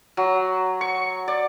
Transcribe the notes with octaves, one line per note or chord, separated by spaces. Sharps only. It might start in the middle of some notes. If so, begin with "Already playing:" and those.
F#3
C#6
D5